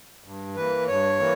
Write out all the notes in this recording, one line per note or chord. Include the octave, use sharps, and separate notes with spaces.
G2
E3 A#3 B4
G2 C#5
E3 A#3